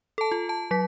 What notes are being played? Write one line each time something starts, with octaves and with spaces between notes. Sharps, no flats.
A4 A5
F4
A5
F#3 B6